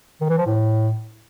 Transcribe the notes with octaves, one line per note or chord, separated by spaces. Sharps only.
D#3
E3
F3
A2